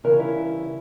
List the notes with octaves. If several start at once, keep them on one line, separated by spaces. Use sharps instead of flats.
C#3 E3 G3 C#4 A#4
E4